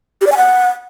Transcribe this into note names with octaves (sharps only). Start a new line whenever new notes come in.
G4
D5
G#5
F#5